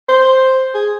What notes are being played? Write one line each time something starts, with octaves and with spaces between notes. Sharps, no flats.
C5
G#4